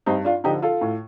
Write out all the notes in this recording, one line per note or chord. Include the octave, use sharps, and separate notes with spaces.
G2 C4 D#4
D4 F4
D3 F3 D#4 G4
F4 A4
A2